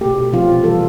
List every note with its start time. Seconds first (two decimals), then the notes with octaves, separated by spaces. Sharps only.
0.01 B2 A3 G4
0.33 C3 F3 A3 F4
0.64 C3 E3 G3 A4